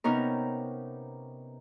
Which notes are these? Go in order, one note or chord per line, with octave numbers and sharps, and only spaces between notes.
C3 B3 C#4 D#4 A#4